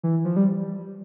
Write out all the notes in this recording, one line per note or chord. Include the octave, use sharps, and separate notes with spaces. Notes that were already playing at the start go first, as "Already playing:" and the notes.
E3
F3
G3